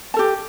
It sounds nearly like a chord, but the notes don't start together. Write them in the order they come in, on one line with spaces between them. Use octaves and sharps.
A5 A4 G4